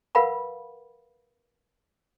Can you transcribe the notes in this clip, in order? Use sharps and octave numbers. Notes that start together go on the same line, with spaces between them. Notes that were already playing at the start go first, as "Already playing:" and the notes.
A#4 B4 F5 F#5 B5 C#6